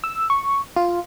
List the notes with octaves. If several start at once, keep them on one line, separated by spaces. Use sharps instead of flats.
E6
C#6
F4